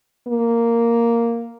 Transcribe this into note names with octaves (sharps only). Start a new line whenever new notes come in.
A#3